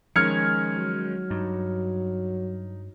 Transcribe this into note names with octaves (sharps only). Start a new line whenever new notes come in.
D#3 F3 G#3 C#4 F6 G#6 C#7
F#3
G2 D#4